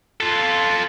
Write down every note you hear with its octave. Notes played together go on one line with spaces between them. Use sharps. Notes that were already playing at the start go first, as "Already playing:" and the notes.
F4 A4